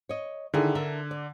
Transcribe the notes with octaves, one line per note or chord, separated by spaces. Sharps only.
C#5 D#5
D3 D#3 E4 G#4
D4 A#4 E5
D5